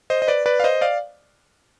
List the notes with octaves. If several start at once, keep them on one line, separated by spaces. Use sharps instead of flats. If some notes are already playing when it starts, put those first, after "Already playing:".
C5 D#5
D#5
B4 D5
B4 D5
F5
C5 D#5
D5 F5